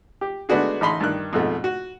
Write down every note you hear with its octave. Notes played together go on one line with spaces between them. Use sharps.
G4
G#3 A3 B3 D4 F#4 G#4
A1 D#4 A5 B5 C6
G2 D#3 F#6
F2 G#2 B2 A3
F#4